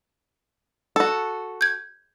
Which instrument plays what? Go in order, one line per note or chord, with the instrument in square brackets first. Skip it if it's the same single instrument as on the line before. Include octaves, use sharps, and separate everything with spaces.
[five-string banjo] F#4 A4
[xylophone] G6 G#6